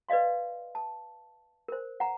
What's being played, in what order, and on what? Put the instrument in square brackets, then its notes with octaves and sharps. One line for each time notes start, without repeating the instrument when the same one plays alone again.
[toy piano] B4 D5 D#5 F5 C6
A5
A#4 C5
F#5 A#5